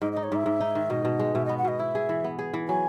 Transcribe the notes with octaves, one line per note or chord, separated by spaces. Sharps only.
G#2 D#5
D#4 D#5
C#5
G#2 E5
G#2
D#4
D#3
B2 D#5
B2
G#3
B2 E5
B3 D#5
F#5
B2 D#5
E4 E5
G#4
E3
B3
G#4
E3
F#3 G#5